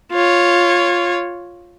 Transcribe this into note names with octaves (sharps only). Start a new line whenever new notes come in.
F4 C#5